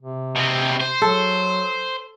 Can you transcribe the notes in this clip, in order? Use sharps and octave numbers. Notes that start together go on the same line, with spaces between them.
C3
B2 C4
C5
F#3 A4